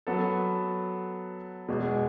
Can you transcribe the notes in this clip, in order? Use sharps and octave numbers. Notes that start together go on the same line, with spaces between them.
F#3 B3 F#4 A4
E2 B2 G#3